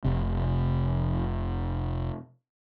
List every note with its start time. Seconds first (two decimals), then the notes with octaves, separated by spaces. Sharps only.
0.05 F1 C3